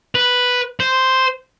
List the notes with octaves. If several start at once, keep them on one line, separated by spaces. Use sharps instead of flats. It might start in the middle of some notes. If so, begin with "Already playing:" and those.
B4
C5